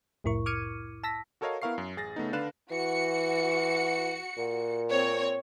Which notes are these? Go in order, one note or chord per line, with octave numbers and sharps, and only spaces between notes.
C2 F2 A2 E4 A#4 C#6
D6 F6 G#6 C#7 D#7
A5 E6 A#6 B6
F#4 A4 A#4 C#5 D#5 F5
B3 E4 A#4 F5 C#6 C7
F#2
A1 G#4 A6 A#6
C#3 A3 B3 D#4
D3 D4 B4 F5 F#6 E7
E3 F#4 C#7
A#2
C4 C#5